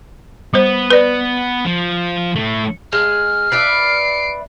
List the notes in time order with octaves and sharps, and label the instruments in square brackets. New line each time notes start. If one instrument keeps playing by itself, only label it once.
[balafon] G3 C5 [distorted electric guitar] B3
[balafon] B4 D5
[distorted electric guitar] F3
A2 A3
[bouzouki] G#3 [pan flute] F6
[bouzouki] B4 D5 E5 [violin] C7 D7